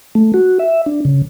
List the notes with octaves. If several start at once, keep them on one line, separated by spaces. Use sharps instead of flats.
A3
F#4
E5
D4
C#3